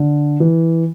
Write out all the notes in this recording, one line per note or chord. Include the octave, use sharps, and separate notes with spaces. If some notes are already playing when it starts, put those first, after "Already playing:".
Already playing: D3
E3